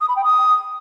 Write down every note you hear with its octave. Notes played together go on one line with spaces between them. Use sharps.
D#6
B5
G5
D#6